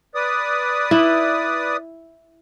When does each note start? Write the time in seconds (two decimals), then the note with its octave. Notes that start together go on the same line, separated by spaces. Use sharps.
0.15 B4 D5 D#6
0.91 E4